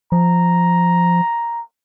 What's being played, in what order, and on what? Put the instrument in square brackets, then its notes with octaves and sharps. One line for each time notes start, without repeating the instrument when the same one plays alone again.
[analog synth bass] F3 [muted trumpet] A#5